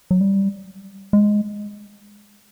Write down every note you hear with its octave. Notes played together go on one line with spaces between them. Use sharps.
F#3
G3
G#3